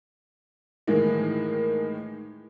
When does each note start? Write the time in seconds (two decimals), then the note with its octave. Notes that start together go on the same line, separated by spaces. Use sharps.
0.87 A2 D#3 E3 G#3 A#3